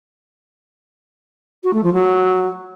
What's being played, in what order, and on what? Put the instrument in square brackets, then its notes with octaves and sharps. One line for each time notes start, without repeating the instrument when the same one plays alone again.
[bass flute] F#4
A3
F3
F#3